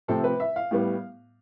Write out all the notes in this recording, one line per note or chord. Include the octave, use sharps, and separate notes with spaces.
C3 F3 A3 C4 A4
B4
E5
F5
A2 G3 B3